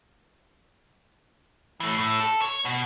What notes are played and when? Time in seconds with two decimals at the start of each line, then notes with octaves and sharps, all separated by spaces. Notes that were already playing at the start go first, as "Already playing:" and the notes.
1.80 E3 A3
1.98 A2 A3
2.20 A4
2.42 C#5
2.65 B2